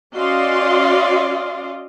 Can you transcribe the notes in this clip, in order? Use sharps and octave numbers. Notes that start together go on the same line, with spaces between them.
C#4 F#4 D5 D#5 F5 C6